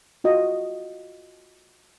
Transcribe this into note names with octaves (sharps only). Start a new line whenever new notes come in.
F4 F#4 D#5